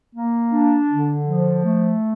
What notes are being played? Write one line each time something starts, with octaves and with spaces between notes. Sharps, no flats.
A#3
D4
D3
F3
A3